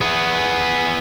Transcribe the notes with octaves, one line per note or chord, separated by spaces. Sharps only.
B3 G#4